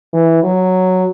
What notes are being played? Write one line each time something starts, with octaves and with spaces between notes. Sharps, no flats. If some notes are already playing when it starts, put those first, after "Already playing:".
E3
F#3